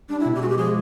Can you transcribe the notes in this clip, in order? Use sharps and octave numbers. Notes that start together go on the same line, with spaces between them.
G3 D4
E4
B2
G4
G#3 F#4
G4
F3 G#4